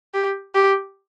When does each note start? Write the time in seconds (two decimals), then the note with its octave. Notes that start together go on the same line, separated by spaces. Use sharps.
0.14 G4
0.55 G4